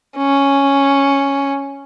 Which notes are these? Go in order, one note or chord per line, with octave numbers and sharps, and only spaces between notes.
C#4